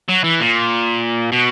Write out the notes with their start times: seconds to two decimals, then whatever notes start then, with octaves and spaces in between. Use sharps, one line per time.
0.09 F#3
0.24 E3
0.40 A#2
1.32 B2